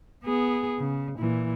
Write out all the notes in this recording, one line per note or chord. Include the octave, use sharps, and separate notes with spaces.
B3 G#4
C#3
A#2 E3